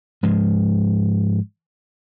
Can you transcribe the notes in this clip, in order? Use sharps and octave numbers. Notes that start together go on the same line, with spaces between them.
G#2 F3 G#3